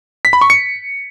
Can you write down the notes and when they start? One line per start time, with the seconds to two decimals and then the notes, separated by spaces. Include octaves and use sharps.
0.25 B6
0.33 B5
0.41 C#6
0.50 C#7